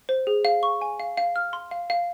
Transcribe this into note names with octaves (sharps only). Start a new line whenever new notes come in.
C5
G#4
F5
C#6
G#5
F5
F5
F6
C6
F5
F5